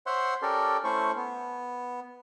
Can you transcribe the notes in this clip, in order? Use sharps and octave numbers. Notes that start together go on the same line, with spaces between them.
C5 C#5 E5 F#5 C6
C#4 G4 A4 A#4 D5
A3 C#4 E4 C5 C#6
B3